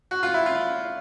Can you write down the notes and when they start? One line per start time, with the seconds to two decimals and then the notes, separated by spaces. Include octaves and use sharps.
0.11 F#4
0.23 F4
0.34 E4
0.46 F4